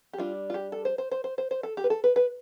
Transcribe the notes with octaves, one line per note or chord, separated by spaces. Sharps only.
G4
G3 D4 F4
F4
G4
A4
C5
C5
C5
C5
C5
C5
A4
G4
B4
A4
B4
B4